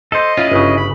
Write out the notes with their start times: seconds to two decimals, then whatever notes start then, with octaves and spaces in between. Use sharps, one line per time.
0.12 A4 C5 D#5
0.37 C#4 E4 F4 G#4
0.52 G1 C#3
0.77 B5